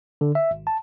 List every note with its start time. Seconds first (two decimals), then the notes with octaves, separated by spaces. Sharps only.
0.21 D3
0.35 E5
0.51 G#1
0.67 A5